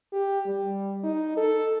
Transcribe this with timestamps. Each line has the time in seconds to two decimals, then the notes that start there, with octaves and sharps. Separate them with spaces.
0.12 G4
0.46 G3
1.03 D#4
1.37 A4